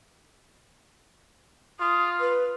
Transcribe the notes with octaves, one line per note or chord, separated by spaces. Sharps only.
F4 D#6
B4